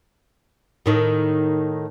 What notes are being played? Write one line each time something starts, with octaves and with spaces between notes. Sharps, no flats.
A2 D#3